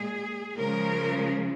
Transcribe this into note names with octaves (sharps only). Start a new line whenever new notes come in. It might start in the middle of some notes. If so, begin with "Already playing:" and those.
Already playing: A#2 G#3 G#4
C#3 F3 G#3 A#4